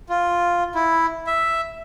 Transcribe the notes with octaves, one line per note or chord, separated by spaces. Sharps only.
F4
E4
E5